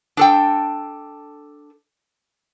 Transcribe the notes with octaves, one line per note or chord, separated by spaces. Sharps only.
D4 A4 G5